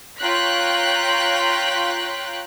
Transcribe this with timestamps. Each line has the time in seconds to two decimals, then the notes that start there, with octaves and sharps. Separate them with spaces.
0.17 F4 C#5 G5 A#5 F#6 B6